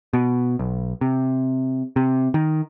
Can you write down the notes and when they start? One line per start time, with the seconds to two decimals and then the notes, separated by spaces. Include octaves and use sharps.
0.13 B2
0.59 B1
1.01 C3
1.96 C3
2.34 D#3